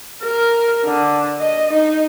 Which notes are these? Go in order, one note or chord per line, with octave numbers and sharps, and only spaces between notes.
A#4
D3
D#5
D#4